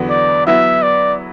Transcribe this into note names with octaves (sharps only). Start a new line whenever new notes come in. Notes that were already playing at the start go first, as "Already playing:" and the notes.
Already playing: E2 D3 F#3 B3 F#4
D5
F#3 B3 E4 E5
D5